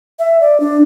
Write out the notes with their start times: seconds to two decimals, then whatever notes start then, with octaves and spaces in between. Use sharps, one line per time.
0.19 E5
0.41 D5
0.60 D4